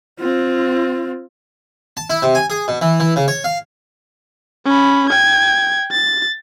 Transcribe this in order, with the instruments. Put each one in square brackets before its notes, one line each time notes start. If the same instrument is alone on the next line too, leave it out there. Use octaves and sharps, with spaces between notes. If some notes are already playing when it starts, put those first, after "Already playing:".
[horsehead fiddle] C4 F4
[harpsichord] A5
E4
C3
G#5
G#4
B2
E3
E3
C#3
C#5
F5
[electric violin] C#4 B5
G5 G#6
A6